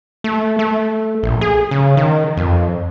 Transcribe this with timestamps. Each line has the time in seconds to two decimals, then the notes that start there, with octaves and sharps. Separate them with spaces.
0.24 A3
0.59 A3
1.23 A#1
1.41 G#4
1.71 C#3
1.97 D#3
2.37 F2